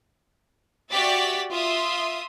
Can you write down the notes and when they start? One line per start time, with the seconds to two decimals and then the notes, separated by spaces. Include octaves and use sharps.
0.90 F#4 G4 D5 E5 A6 B6
1.51 F4 E5 C6 D#6